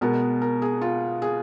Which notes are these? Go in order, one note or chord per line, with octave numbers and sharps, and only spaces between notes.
B2 G#3 B3 A#4
A#4
G#4
F4
G#4